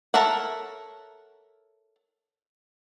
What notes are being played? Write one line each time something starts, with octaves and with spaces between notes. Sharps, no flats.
A4 A#4 C#5 E5 F#5